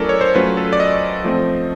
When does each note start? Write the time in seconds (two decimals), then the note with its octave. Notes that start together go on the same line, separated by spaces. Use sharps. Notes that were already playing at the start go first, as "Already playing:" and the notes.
Already playing: F#3 A3 C#4 E4 A4 A#4 D5
0.09 C#5
0.21 C5
0.35 F#3 A3 C#4 F4 B4
0.57 A4
0.73 D5
0.80 D#5
1.24 F3 A3 C4